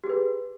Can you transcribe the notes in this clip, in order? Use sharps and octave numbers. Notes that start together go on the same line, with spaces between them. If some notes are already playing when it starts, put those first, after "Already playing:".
G4 G#4 B4